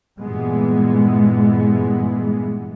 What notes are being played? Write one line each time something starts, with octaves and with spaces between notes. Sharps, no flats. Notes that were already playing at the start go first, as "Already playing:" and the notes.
G2 A#2 E3 G#3 B3